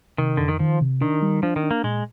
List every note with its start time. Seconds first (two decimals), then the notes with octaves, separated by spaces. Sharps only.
0.18 C3 D#3
0.37 F2 D3
0.48 D#3
0.59 D#3 F3
0.81 C3
1.01 D#3 D4
1.22 G3
1.43 F3 D4
1.56 D#3
1.63 D4
1.71 A#3
1.84 A#2 G#3